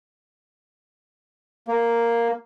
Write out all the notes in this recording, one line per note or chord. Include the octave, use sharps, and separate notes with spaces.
A#3